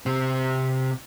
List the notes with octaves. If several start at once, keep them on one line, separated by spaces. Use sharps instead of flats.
C3 C4